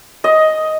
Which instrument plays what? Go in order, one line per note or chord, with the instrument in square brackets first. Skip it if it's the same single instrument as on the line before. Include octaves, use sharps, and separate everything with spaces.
[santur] D#5